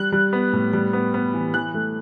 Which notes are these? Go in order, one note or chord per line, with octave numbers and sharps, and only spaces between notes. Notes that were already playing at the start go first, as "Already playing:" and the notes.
Already playing: G3 F#6
G3
B3
A2
G3
B3
B3
E3
E3 F#6
A3